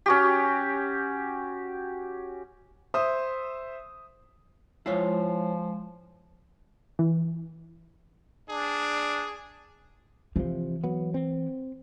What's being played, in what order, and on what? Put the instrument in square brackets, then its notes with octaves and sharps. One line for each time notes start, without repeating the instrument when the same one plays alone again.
[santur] C#4 F#4 G4
[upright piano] C5 E5 D#6
[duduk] F3 [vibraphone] G#3 [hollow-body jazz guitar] E4 F4 C#5
[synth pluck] E3
[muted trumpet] D4 [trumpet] G#4
[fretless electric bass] C3 F3 [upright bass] E3
[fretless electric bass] F#3 B3
C4